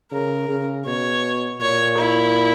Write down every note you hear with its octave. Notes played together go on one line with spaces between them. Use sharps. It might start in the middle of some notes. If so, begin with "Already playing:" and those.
C#3 A#4
C#3
B2 C#5
A#2 C#5
E4